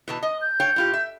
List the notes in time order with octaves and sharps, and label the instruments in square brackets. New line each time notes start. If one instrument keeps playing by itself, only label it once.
[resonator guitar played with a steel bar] B2 E3 A5
[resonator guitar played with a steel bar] D#5 [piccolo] D#6
[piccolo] G6
[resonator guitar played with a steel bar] C#5 F5 G5
A2 F4 G4
E5